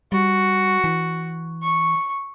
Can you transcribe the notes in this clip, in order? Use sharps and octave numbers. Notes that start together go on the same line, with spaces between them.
G3 F#4
E3
C#6